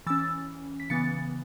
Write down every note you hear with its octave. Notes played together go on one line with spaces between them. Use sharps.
E3 C#4 E6 A6
B6
C#3 E3 B3 A6 C#7